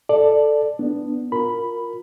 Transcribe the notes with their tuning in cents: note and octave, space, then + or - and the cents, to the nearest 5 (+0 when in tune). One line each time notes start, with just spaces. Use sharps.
A4 +0 D5 +15
B3 +0 D4 +0
F4 +20 A#4 +0 B5 +5